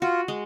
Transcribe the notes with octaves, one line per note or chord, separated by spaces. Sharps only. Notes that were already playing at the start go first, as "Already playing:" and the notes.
F4 F#4
G#3